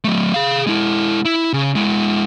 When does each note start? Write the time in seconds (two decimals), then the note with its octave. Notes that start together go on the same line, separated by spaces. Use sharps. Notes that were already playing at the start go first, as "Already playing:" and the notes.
0.04 F#3 A3
0.34 G#4 F5
0.67 G#3 E4
1.25 E4
1.53 C#3
1.75 G#3 E4